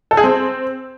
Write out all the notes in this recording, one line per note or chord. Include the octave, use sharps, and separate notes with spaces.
A4
G#4
C4